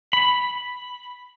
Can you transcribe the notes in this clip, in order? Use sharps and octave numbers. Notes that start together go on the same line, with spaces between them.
B5